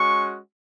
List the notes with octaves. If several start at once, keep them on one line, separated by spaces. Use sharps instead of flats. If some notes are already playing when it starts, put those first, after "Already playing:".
Already playing: G#3 C#4 F#4 C#6